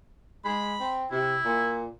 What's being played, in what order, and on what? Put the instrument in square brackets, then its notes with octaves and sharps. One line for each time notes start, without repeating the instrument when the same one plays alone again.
[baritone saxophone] G#3 [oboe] B5
[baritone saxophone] C4
[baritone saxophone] C3 [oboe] E4
[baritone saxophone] A#2